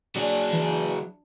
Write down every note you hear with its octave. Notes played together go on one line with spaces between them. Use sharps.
F#3 D4 G#4
E3